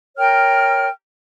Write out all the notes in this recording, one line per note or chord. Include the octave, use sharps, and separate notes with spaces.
A#4 C#5 G5 F6